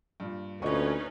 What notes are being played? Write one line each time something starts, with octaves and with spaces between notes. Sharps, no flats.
G2 A#2
D2 A#2 C#4 D#4 B4 C#5 D#5 C#6